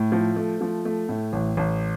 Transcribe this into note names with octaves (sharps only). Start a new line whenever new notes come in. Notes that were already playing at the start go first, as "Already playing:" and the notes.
Already playing: A2
F3
A3
F3
A3
A2
A1
A1